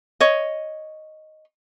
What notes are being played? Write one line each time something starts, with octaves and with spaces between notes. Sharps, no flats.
C#5 D#5